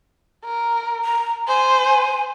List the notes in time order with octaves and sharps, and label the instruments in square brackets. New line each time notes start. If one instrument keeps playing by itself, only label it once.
[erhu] A#4
[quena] A#5
[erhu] C5 [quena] G#5